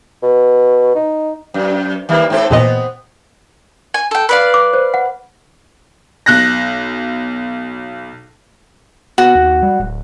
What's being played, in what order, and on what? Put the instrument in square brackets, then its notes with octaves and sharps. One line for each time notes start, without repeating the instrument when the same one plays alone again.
[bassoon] B2
D#4
[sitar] F#2
D#3 G3 A#3
G#2 C4 A4
[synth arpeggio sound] E2 A#2 D#5 [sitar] B3 C4
[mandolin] G#5
A4 G5
B4 D5 F5
[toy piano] D6
C5
F#5
[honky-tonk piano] B1 F#6 A#6
[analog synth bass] B3 [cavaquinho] F#4
[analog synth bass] D#2
G3
D1